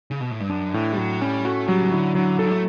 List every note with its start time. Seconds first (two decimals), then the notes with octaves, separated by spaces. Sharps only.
0.11 C#3
0.20 B2
0.31 A2
0.40 G2
0.50 F#2 D4
0.74 A2 E3
0.92 G3
0.98 A2 F#3
1.21 G3 C#4
1.45 A3 F#4
1.67 F#3 G3
1.81 C#3
1.91 D3 E4
2.15 D3 F#3
2.39 C#3 A4
2.51 A3